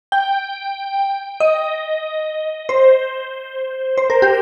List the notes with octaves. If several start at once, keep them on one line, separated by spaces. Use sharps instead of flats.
G5
D#5
C5
C5
A#4
G4